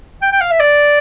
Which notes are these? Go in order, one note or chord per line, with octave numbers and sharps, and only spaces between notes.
G5
G5
F5
E5
D5